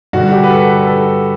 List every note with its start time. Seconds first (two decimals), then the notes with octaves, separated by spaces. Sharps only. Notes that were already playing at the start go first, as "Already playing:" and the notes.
0.13 G2 D3 F#4
0.32 G4
0.44 B4
0.50 A4
0.69 B4
0.87 A4